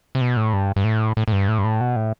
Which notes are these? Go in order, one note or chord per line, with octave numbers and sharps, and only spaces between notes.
C3
B2
A2
G2
G2
A2
A2
A2
G2
A2
G2
A2
B2
A2